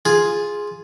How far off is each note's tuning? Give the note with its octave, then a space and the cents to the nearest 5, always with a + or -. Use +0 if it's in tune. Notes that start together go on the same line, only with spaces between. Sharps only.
F4 +0 G#4 +0